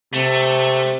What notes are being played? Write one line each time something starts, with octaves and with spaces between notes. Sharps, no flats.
C3 A3